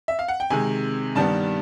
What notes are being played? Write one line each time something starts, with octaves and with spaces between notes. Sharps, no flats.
E5
F5
F#5
G5
C3 D#3 G#3 G#5
G2 D#3 G3 B3 D4 A5